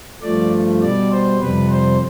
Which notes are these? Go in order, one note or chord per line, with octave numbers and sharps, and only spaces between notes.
G2 F3 A3 D5
B2 G3 D5
C5
F2 C3 G3 B4
C5